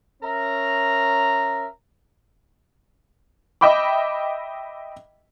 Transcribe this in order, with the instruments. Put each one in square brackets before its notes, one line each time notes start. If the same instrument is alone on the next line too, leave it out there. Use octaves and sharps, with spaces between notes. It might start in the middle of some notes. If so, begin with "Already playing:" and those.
[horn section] C#4 A#4 E5 A#5
[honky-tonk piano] D#5 E5 G5 B5 D6